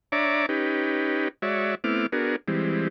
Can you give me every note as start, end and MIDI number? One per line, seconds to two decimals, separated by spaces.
0.12 0.46 62
0.12 0.46 73
0.12 0.46 74
0.12 0.46 76
0.12 0.46 82
0.12 0.46 86
0.49 1.28 61
0.49 1.28 63
0.49 1.28 67
0.49 1.28 71
1.42 1.75 56
1.42 1.75 66
1.42 1.75 73
1.42 1.75 74
1.42 1.75 76
1.84 2.06 57
1.84 2.06 59
1.84 2.06 60
1.84 2.06 64
1.84 2.06 86
1.84 2.06 89
2.12 2.36 59
2.12 2.36 62
2.12 2.36 66
2.12 2.36 68
2.12 2.36 70
2.48 2.88 52
2.48 2.88 55
2.48 2.88 56
2.48 2.88 60